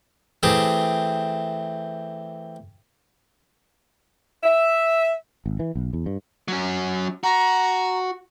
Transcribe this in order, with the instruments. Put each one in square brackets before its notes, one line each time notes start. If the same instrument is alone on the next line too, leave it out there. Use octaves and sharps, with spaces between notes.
[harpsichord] E3 A3 C4 G4 G#4
[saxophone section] E5
[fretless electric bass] G#1
E3
B1
E2
G2
[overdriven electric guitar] F#3 C#4
[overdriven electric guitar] F#4 [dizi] A#5